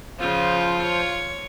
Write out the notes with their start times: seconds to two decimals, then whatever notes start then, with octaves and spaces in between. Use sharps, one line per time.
0.20 C#3 F3 F4 C5
0.82 C#5